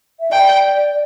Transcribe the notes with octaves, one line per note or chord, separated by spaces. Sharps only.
E5
D5 G5